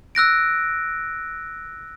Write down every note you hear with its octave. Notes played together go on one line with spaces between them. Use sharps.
E6 F#6 A#6 D7